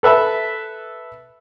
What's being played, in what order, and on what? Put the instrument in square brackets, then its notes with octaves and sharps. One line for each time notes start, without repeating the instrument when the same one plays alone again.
[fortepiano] A4 B4 E5 A5 B5